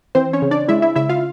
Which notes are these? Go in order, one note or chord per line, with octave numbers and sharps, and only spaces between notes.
E3 C4 C5
C#4 C#5
C#3
D4 D5
G#3 E4 E5
E4 E5
C#3 E4 E5
F4 F5